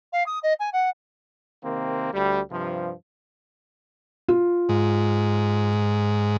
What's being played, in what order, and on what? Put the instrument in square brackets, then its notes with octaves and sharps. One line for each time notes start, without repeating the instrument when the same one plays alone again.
[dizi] F5
D#6
D#5
G#5
F#5
[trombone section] C3 D#3 A#3 C4
D2 G3
G2 C3 F3
[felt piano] F4
[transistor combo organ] G#2